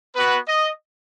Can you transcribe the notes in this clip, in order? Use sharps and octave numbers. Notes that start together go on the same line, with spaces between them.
B3 F#4 B4
D#5